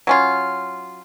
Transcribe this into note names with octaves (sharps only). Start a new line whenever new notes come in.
F#3 C#4 F4